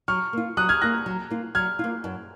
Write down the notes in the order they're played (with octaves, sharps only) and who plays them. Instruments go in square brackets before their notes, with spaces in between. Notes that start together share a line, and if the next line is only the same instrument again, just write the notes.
[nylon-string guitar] F#3 [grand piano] C#6 F6
[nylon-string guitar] A#3 F4
[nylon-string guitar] F#3 [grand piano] D#6 F#6
[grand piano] F6 G#6
[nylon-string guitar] A#3 F4 [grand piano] F#6 A#6
[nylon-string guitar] F#3
A#3 F4
[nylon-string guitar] F#3 [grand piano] F6 G#6
[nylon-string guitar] A#3 F4
F#2